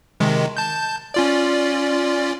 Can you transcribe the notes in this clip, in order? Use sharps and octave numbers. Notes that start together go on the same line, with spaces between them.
C3 D#3 G#3
A5 G6
C#4 F4 D5